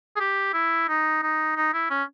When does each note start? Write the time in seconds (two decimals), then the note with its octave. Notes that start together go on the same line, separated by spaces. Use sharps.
0.16 G#4
0.20 G4
0.54 E4
0.88 D#4
1.23 D#4
1.56 D#4
1.73 E4
1.90 C#4